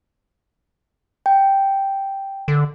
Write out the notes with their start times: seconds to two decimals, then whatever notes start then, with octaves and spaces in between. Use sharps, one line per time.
1.26 G5
2.48 D3